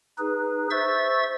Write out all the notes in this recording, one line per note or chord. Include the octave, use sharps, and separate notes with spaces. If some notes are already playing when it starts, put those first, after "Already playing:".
D#4 G#4 B4
C5 E5 C#6 E6 A6